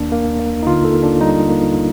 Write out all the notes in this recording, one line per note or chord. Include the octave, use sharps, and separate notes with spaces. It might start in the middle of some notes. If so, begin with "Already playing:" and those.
Already playing: D#2 A#3 D4
A#3
A#3
D#4
D3 F4
A4
A#3
D4
G3 D#4
A#3